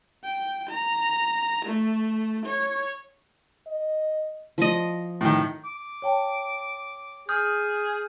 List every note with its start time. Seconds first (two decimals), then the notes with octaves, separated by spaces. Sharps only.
0.24 G5
0.69 A#5
1.65 A3
2.45 C#5
3.67 D#5
4.58 F3 D#5
5.21 A2 D#3
5.64 D6
6.02 C#5 G5 A5
7.29 G#4 D#6 F6 G6